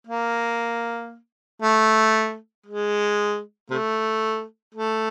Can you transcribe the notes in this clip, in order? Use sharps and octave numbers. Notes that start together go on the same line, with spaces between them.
A#3
A3
G#3
C3 A3
A3